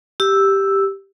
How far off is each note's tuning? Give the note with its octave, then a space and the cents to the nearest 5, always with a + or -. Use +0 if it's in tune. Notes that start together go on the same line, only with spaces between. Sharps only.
G4 +0 E6 +0